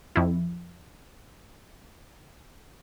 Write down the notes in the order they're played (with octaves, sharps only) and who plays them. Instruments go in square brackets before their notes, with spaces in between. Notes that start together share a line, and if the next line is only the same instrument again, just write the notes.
[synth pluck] F2 E4